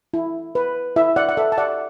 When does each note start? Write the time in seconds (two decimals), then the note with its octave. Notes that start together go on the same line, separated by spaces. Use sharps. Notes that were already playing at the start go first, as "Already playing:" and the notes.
0.14 E4
0.55 B4
0.96 E4 E5
1.16 D5 F#5
1.29 F#5
1.37 A4 E5
1.52 A5
1.58 D5 F#5